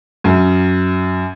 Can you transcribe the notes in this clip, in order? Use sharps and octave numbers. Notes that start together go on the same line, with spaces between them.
F#2